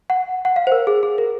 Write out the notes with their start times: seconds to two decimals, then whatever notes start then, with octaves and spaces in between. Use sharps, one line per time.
0.10 F#5
0.45 F#5
0.56 F5
0.67 C5
0.72 A#4
0.87 G#4
1.03 G#4
1.18 A#4